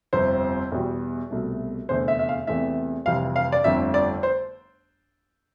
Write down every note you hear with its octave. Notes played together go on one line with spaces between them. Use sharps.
G1 F2 C3 C5
E2 B2 G3
C2 B2 A3
F1 E2 D3 A3 C5
E5
E5
F5
E2 C3 E3 A3 E5
F1 F2 E3 G3 F5
F5
D5
G1 F2 D3 A3 E5
D5
C5